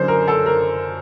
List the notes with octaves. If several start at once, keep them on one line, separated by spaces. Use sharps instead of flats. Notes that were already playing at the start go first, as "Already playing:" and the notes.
Already playing: F#1 F#2 D3 F#3 C5
A#4
A4
A#4